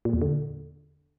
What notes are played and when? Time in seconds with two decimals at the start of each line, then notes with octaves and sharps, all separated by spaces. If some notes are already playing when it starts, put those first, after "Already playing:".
0.05 A#2
0.13 E2
0.22 D3